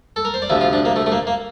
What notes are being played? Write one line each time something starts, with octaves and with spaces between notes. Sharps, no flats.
A4
A#4
C5
D5
D2 C3 F3 E5
F4
D4
A#3
A3
A3
A#3
A#3